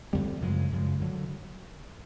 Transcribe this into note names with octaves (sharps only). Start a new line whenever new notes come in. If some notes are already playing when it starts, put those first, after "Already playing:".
F2 D3 G3 C4
F#2 C#3 F3 G#3
F#2 C#3 F3 G#3
G2 D3 F#3